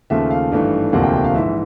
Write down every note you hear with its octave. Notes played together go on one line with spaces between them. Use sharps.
D#2 C#3 F3 A3 E5
F5
G#1 G2 E3 A3
E1 D2 C3 F3 A#3 F#5
G5
G5
F5
A#1 G#2 E3 E5